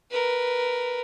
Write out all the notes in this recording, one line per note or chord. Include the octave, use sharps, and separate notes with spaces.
A#4 B4